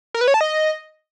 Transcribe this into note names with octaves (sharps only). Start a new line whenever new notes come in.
A#4
B4
C#5
A5
D#5